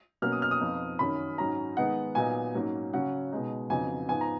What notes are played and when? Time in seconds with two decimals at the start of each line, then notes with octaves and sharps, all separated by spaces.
0.22 B2 F#3 A#3 C#4 F6
0.32 D#6
0.42 F6
0.51 D#6
0.61 F2 F3 B3 D#4
0.99 F#2 D#3 F#3 C#4 B5
1.38 G#2 F#3 C#4 A#5
1.77 D#3 G#3 B3 D#4 F#5
2.15 A#2 F#3 B3 D#4 G#5
2.54 G#2 F#3 A#3 C#4
2.93 C#3 F#3 C#4 F#5
3.32 B2 G#3 D#4
3.70 F2 C#3 F#3 B3 D#4 G#5
4.09 G#2 F3 B3 G#5
4.21 A#5